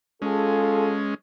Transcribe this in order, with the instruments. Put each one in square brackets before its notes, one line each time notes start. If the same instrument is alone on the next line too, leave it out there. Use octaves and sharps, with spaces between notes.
[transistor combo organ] G#3 C#4 [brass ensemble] F4 G#4 A4